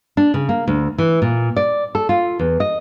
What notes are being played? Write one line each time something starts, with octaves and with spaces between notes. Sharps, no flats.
D4
C#3
A#3
D2
E3
A#2
D5
A4
F4
E2
D#5